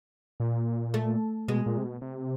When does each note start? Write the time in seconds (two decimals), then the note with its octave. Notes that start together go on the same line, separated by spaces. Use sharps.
0.40 A#2
0.94 A3
1.48 B2 G#3
1.66 A#2
1.78 C3
1.84 B2
2.01 C3